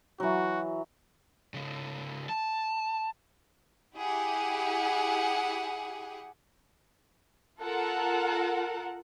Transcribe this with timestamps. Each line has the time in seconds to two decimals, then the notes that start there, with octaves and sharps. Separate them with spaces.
0.20 E3 F#3 F#4
1.54 C#3 F3
2.29 A5
3.96 E4 G4 G#4 F#5
7.61 F4 A4 A#4 F#5